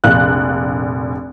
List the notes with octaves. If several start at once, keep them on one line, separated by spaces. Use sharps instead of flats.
F1 A#1 F5 F#6